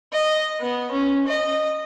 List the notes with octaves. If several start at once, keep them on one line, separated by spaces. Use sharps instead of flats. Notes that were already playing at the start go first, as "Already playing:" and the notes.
D#5
B3
C#4
D#5